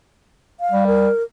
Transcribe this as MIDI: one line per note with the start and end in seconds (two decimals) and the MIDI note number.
0.60 0.85 77
0.72 1.08 55
0.87 1.23 70